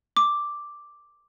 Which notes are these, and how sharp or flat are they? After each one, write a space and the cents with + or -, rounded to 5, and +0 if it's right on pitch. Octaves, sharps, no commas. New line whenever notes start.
D6 +0